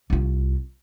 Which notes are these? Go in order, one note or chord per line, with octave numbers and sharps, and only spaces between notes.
C2 F4